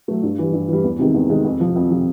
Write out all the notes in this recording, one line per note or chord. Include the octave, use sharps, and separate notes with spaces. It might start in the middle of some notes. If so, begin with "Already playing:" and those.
F#3 A3
G2
E3 G3
G2
E3 G3
E2
C3 D#3 G#3
E2
C3 D#3 G#3
F2
C3 F3
F2
C3 F3